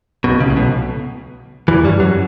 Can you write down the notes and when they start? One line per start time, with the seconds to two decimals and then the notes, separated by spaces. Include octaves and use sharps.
0.24 B1 B2
0.40 C#2 C#3
0.50 A2
0.57 B1 B2
1.68 E2 E3
1.84 G2 G3
2.00 F#2 F#3